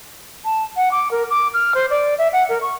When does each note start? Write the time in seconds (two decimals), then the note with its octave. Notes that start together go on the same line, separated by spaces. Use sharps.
0.44 A5
0.76 F#5
0.91 D6
1.10 A#4
1.30 D6
1.53 F6
1.74 C5
1.90 D5
2.18 E5
2.32 F#5
2.48 A#4
2.61 C#6